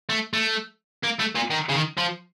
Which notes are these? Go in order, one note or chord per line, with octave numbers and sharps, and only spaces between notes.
A3
A3
A#3
A3
A#2
D#3
C#3
D#3
F3